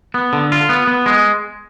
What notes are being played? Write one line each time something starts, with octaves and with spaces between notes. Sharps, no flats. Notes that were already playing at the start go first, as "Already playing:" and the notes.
B3
D3
F4
B3
B3
G#3